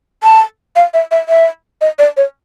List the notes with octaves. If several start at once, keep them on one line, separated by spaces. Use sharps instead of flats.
A5
F5
E5
E5
E5
D#5
D5
C#5